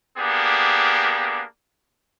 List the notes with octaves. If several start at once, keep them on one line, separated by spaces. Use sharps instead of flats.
A#3 B3 D4 G4 G#4